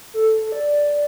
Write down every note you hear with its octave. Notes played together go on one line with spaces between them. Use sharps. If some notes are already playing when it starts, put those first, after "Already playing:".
A4
D5